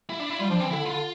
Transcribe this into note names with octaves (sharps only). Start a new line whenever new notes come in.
E4
D4
E4
G3 F4
F3 D4
E3 C4
D3 E4
D3 F4